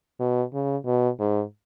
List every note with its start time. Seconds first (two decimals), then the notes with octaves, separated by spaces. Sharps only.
0.20 B2
0.53 C#3
0.86 B2
1.19 G#2